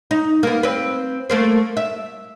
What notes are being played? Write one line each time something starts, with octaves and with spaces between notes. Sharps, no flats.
D#4
A#3 B3
C4 B4
A3 A#3 C5
E5